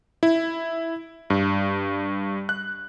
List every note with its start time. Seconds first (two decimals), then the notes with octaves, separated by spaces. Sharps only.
0.23 E4
1.30 G2
2.49 F#6